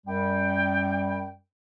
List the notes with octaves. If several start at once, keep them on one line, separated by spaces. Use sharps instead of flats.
F#2 G3 G5